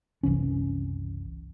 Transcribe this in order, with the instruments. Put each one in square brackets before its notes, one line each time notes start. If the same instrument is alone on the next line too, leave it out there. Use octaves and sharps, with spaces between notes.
[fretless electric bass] F#1 C2 E3 C#4